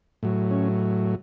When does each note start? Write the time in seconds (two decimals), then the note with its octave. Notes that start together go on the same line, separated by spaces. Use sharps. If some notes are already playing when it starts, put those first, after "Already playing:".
0.23 A2 F#3
0.51 C#4